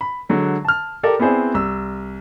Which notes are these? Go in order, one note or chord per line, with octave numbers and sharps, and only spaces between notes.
B5
D3 F#3 G#3
A5 F6
G4 A4 A#4 D5
B3 C4 E4 G#4 C5 D5
C2 E6